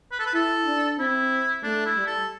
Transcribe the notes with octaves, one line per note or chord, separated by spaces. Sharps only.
B4
A4
B4
E4 A4
D4
C4 E4
A3 D4
E4
G3
A4